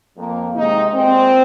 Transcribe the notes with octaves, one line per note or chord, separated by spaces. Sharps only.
F2 F3 A#3
C3 D#3 G#3 D#4
A#2 G#3 C4